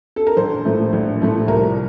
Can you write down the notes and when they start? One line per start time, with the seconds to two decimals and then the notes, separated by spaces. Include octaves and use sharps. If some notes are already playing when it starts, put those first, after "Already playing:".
0.16 A4
0.27 A#4
0.37 A#1 C5
0.64 A2 F3 A3
0.93 A#1
1.21 A2 F3 A3
1.48 C2 A#4